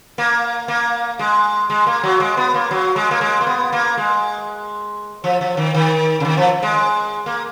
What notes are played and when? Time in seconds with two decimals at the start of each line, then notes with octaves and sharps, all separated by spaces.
0.18 A#3
0.68 A#3
1.19 G#3
1.70 G#3
1.87 A#3
2.03 F#3
2.20 G#3
2.37 B3
2.54 A#3
2.71 F#3
2.96 G#3
3.11 A#3
3.21 G#3
3.41 A#3
3.47 B3
3.73 A#3
3.97 G#3
5.24 F3
5.41 F3
5.57 D#3
5.74 D#3
6.20 C#3
6.25 D#3
6.37 F3
6.63 G#3
7.26 A#3